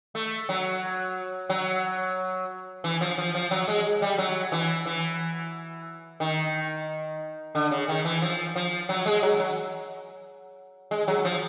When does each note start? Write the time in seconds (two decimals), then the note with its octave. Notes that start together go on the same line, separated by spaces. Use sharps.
0.15 A3
0.49 F#3
1.50 F#3
2.84 E3
3.01 F3
3.18 F3
3.35 F3
3.51 F#3
3.68 G#3
4.02 G3
4.18 F#3
4.52 E3
4.86 E3
6.20 D#3
7.55 D3
7.71 C#3
7.88 D#3
8.05 E3
8.22 F3
8.56 F3
8.89 F#3
9.06 G#3
9.23 F#3
9.40 F#3
10.91 G#3
11.08 F#3
11.24 F3